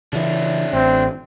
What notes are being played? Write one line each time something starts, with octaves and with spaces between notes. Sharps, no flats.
C#3 E3 D4 C#5 E5
A1 C4